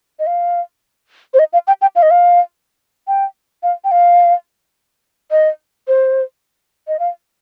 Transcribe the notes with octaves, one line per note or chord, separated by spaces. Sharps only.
D#5
F5
C5
D#5
F5
G5
G5
F5
D#5
F5
G5
F5
G5
F5
D#5
C5
D#5
F5